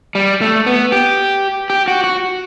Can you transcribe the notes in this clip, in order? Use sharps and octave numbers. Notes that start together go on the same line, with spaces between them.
G3
A3
B3
G4
G4
F#4
F#4